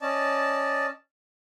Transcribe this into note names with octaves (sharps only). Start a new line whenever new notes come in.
C#4 D5 D#5 A5